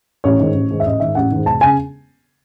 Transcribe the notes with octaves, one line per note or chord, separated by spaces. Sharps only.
A1 C#5
G#2 D#3
A1
G#2 D#3
E5
A1 D#5
G#2 D#3 E5
A1 F#5
G#2 D#3
E1 A5
C#3 G#5